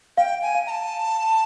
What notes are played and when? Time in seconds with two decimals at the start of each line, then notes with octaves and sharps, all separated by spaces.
0.17 F5 G5
0.42 G#5
0.55 F5
0.67 A#5
0.71 A5